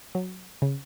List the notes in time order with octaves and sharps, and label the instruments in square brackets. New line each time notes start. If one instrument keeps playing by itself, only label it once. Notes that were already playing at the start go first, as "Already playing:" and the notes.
[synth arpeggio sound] F#3
C#3